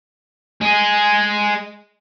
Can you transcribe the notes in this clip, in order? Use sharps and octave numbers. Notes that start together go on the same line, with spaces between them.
G#3 G#4